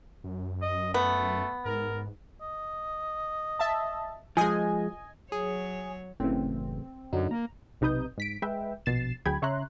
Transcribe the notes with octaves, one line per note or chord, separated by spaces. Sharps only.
F#2
D#5
A3 B3
G#2 A#4
D#5
E5 A5
F3 G#3 D#5 G#5
F#3 G#4 C#5
F#1 A2 C#3 E3 C4
F#2 D3 F#3 D#4
A#3 A#5
B1 C3 D#4 B4 D#6 G6
G#2 B6 D7
G#3 B4 E5 G5
A#1 B2 A6 C7 E7
D2 F#3 G#4 G5 B5 G#6
C#3 C#5 E5 A#5 C6 F#6